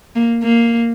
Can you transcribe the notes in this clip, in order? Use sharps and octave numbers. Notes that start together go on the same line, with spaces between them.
A#3
A#3